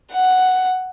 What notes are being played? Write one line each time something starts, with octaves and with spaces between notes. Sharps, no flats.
F#5